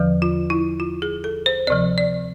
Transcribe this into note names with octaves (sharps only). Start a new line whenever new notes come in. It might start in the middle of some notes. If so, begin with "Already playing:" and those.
Already playing: E2 D3 F3
F4
E4
F4
G#4
A4
C5
D2 C3 F3 D5
D5